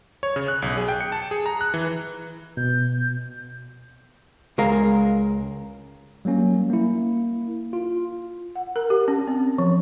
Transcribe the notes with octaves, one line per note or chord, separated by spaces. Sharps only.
C#5
C#3
F#6
B1
G#4
G5
C#7
A5
G#4
A#5
F#6
E3
B2 G6
C#2 G#3 A#4 F5
F#3 G3 A#3 C#4
A#3 E4
F4
F#5
A#4
G4
C#4
C4
F3